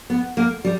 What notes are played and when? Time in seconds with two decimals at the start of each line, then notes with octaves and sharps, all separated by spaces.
0.10 B3
0.37 A#3
0.65 G3